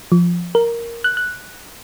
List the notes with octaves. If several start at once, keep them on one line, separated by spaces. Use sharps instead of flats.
F3
A#4
F#6
F#6